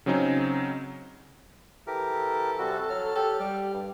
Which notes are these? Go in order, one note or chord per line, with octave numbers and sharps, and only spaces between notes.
C#3 F#3 C4 C#4 D#4
E3 G4 A4 A#4
C3 G3 F#4
F#3 F6
G4 A4
G3
G2